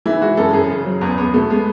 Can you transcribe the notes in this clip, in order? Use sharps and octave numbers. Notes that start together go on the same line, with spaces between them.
E3 E4
G#3 F#4
F#2 A4
F#2 G#4
C#3
F#3
E2 B3
E2 B3
B2 A3
G#3 B3